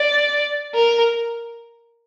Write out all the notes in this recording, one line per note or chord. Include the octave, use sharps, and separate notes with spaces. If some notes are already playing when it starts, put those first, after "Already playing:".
Already playing: D5
A#4